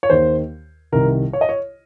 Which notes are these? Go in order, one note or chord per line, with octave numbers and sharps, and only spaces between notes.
C#5
D#2 D#3 C5
C2 C3 D#3 A#4
C#5
D#5
C#5